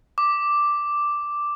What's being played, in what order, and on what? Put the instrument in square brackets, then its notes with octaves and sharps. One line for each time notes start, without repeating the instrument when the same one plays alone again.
[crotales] D6